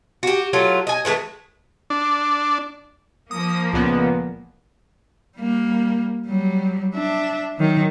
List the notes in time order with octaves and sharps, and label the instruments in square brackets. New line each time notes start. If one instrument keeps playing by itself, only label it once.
[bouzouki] F#4 G4
F#3 A3 F4
D#5 G#5
D#3 E3 G#3 A3
[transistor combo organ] D4
[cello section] F3 A#3 [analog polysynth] D#6
[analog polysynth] C#2 A#2 B3
[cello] G3 A#3
F#3 G3
D4 E5
D#3 F#3